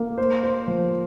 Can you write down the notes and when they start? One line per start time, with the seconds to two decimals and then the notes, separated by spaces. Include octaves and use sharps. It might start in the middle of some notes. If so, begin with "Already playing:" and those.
Already playing: A#3
0.18 C5
0.44 C5
0.67 F3